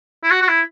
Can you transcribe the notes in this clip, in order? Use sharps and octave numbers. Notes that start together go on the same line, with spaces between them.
E4
F#4
F#4
E4